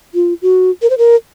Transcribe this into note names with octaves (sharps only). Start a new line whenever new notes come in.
F4
F#4
A#4
C5
A#4